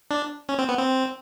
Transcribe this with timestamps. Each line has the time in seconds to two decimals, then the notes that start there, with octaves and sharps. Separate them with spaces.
0.11 D4
0.49 C#4
0.59 C4
0.69 B3
0.78 C4